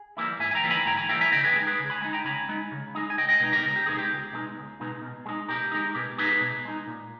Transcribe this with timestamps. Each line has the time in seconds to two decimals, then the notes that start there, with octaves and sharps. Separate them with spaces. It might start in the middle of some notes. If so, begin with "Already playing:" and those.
Already playing: G#4
0.17 E3 G3 A#3 E4
0.39 G#2 E5 G#5
0.51 G#5
0.55 G5 A#5
0.63 E3 G3 A#3 E4
0.70 G#5 B5
0.86 G#2 G5 A#5
0.97 G#5 B5
1.09 E3 G3 A#3 E4 G5 A#5
1.21 E5 G#5
1.32 C#3 D#5 G5
1.44 G#4 B4
1.56 G#3 D#4
1.67 G#4 B4
1.79 C#3
1.90 G#5 B5
2.01 G#3 D#4 G#5 B5
2.13 G5 A#5
2.24 C#3 G#5 B5
2.49 G#3 D#4
2.72 C#3
2.95 G#3 D#4
3.10 G#5
3.17 C#2 D#5 G5
3.29 D#5 G5
3.40 B2 G#3 D#4
3.52 G4 A#4
3.63 C#2
3.76 G4
3.86 B2 G#3 D#4 G#4
3.99 G4
4.11 C#2
4.33 B2 G#3 D#4
4.56 C#2
4.80 B2 G#3 D#4
5.02 B2
5.26 G#3 D#4
5.48 B2 G4 A#4
5.72 G#3 D#4
5.94 B2 G4
6.18 G#3 D#4 G#4 B4
6.41 B2
6.65 G#3 D#4
6.87 A#2